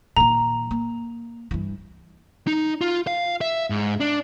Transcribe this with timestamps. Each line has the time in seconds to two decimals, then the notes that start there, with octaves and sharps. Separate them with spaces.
0.17 A#2 D#3 A#5
0.71 A#3
1.51 G2 E3
2.47 D#4
2.81 F4
3.07 F5
3.41 E5
3.70 G#2
4.00 D4